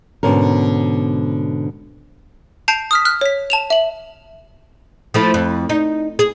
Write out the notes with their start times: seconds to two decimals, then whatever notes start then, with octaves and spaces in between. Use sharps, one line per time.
0.23 G#2 B2 D3 C#4 A#4
2.68 A5 G6 C7 D7 F7
2.91 D#6 F6 B6
3.05 F6 F#6 B6
3.21 C#5 B6
3.50 A5 E7 F7
3.70 E5 F#7
5.14 F3 A3 E4
5.34 F2
5.69 D#4
6.19 G#4